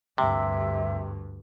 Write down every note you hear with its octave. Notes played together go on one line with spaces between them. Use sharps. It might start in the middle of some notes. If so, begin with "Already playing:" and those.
D2 G2 C3 E5